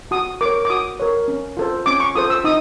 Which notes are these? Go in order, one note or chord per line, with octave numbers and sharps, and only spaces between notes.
F#4 D#6
A#4 C#5 D6
D6
F#4 D#6
A#4 C#5
C#4
F4 A4 C5
C#4 D6
C#6
F4 A4 C5 D#6
E6
D#4 D#6